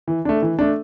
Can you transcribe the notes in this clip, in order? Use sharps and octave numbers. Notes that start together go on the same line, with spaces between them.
E3
A3 D4
E3
A3 D4